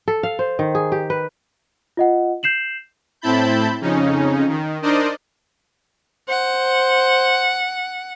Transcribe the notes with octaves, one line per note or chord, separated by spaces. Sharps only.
A4
F5
C5
D#3
G#4
G4
B4
F4 D#5 F#5
G6 C7 E7 F#7
A2 C4 E4 A5 B5 G6
F2 C#3 C#4 D#4
D#3
D4 D#4 A#4 C5 D5 D#5
C5 F#5